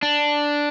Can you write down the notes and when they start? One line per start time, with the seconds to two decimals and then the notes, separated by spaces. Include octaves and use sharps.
0.03 D4